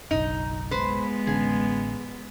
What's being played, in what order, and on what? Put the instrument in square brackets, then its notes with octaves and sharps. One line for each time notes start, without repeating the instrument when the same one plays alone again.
[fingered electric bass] F#1 B1 [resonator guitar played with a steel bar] D#4
[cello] G#3 B3 [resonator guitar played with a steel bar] B4 C5
[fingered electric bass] A1 D3 C#4 [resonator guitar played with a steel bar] G#4